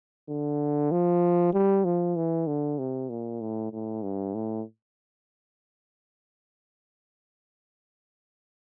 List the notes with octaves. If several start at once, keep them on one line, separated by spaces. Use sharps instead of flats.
D3
F3
G3
F3
E3
D3
C3
A#2
A2
A2
G2
A2